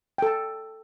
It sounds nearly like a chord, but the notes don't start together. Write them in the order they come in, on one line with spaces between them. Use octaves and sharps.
G5 A4 A5